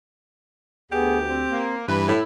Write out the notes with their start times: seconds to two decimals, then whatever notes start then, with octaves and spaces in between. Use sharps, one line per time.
0.92 D2 B3 G4 G#4
1.29 C4 C5
1.51 A#3
1.88 G2 E3 G3 B4
2.08 A2 E4